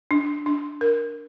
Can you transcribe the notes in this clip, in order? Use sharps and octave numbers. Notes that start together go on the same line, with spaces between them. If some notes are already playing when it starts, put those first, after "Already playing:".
D4
D4
A#4